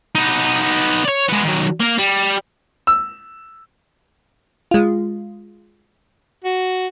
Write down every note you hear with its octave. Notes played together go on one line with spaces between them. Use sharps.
B3 D#4
C#5 D5
G#3 B3
D#3 F#3
A#3 A#4
G3
E6
G#3 F4
F#4